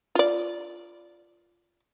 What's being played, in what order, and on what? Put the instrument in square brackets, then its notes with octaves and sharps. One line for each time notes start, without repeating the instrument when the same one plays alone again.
[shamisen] F4 D5